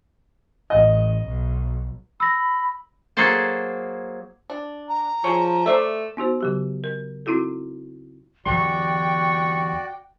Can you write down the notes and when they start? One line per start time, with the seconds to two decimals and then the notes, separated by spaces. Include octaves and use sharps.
0.70 A1 D#5
1.27 B1
2.20 B5 E6 A#6
3.17 F#3 A#3 G#4 A4 C5 A5
4.50 D4
4.89 A#5
5.24 F3 G#4 C#5
5.66 A3 C5 D5 E5
6.17 B3 D#4 F#4 C5
6.41 C#3 F#3 G4
6.84 A#4
7.26 C4 D#4 E4 F#4 A4
8.46 E2 D3 F#3 F#4 D5 G5 C#6